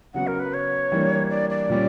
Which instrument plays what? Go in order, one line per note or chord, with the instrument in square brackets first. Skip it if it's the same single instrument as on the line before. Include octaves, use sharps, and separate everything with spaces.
[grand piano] C#3 F#3 B3 F#4 [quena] F#5
[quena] A#4
B4
C#5
[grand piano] E3 G3 A#3 D4
[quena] D5
D5
[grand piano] A#2 G3 C#4